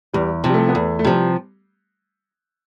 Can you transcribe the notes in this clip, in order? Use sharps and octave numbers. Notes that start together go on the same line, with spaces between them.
E2 G3
C3 F3
G3
A3
B3
E2 A3
A3
C3 F3 G3